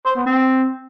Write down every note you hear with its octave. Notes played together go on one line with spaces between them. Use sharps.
C5
B3
C4